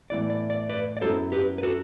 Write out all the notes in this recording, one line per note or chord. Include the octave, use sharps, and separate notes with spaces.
A2 E3 B3 D5
D5
D5
B4 D5
D5
F#2 F#3 B3 E4 A4 C5
G4 B4
B4
F#4 A4